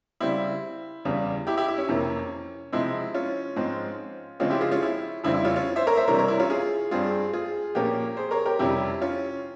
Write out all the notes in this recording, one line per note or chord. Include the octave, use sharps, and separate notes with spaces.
C#3 G3 C4 E4
E2 C#3 G3
E4 G4
E4 G4
E4
C#4
F2 C3 E3 A#3
C3 F3 G#3 C4 E4
C#4 F4
G#2 F3 G#3 C4
C#3 F3 G#3 C4 C#4 F4
E4 G4
F4 G#4
C#4 F4
E4
F2 C#3 E3 G3 C4 E4
E4
C#4 F4
C#4 F4
C5 E5
A#4 C#5
C5 E5
C3 E3 G3 C4 A#4 C#5
A#4 C#5
E4
C#4 F4
F4 G#4
G2 G3 C4 F4 G#4
F4 G#4
A#2 F3 A#3 C#4 G4 A#4
G#4 C5
A#4 C#5
G4 A#4
F2 C3 G3 C#4 E4 G4
C#4 F4